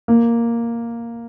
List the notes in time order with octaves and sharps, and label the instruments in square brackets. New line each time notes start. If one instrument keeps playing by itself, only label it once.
[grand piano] A#3